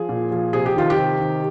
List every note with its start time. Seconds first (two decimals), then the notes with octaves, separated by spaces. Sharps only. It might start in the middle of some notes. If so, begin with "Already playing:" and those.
Already playing: F3 G#4
0.09 A#2
0.32 F3
0.53 C3 G#4
0.66 G4
0.76 D#3 F4
0.90 G4
0.98 C3
1.20 D#3